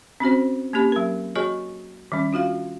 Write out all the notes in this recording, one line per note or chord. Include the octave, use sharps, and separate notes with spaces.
C4 C#4 F#4 C5
A#3 C#4 G4 B5
F#3 A#4
F#4 G#4 C#5 D#5 G#5 C#6
D#3 G3 C#4
D4 F4 F#4 F5